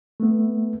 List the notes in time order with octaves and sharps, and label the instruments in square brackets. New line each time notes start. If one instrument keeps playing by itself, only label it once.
[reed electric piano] A3 B3